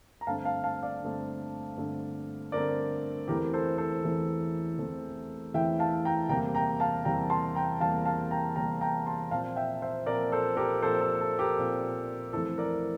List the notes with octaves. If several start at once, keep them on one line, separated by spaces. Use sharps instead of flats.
A#5
G2 D3 A3 C4 F5 A5
F5 A5
F5 A5
D5 F5
G2 D3 A3 C4
G2 D3 A3 C4
G2 D3 A3 C4 A#4 D5
E2 E3 A3 C4 G4 A#4
A4 C5
A4 C5
E2 E3 A3 C4
E2 E3 A3 C4
E2 E3 A3 C4 E5 G5
F5 A5
G5 A#5
E2 C3 G3 A#3 G5 A#5
G5 A#5
F5 A5
E2 C3 G3 A#3 G5 A#5
A5 C6
G5 A#5
E2 C3 G3 A#3 F5 A5
F5 A5
G5 A#5
E2 C3 G3 A#3 G5 A#5
G5 A#5
A5 C6
A#2 F3 C4 F5 A5
E5 G5
C5 E5
A#2 F3 C4 A#4 D5
A4 C5
G4 A#4
A#2 F3 C4 A4 C5
A4
A4
G4 A#4
A#2 F3 C4
F2 E3 A3 C4 A4 C5
A#4 D5